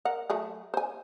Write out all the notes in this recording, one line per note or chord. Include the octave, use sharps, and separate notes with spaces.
A#4 F#5
F#3 A3 G#4
C5 G#5